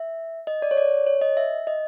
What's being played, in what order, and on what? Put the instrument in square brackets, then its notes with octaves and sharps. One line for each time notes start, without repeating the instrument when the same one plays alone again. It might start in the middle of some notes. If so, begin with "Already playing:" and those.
Already playing: [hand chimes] E5
D#5
D5
C#5
D5
C#5
D#5
E5
D#5